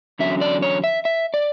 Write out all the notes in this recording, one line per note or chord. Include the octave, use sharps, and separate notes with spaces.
E2 D3 F#3 C#4 E5
D5
C#5
E5
E5
D5